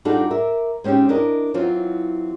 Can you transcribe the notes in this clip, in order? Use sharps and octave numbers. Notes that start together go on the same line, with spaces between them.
G3 D4 D#4 F4 F#4 A4
A#4 D5 E5
G#3 C4 C#4 D#4 G4
D4 E4 A#4 D#5
E3 F#3 C4 F4